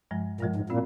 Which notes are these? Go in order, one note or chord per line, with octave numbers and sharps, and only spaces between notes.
G2 F3 G#3
G2 A#2 F3 G#3
G#2
A#2 C4 F4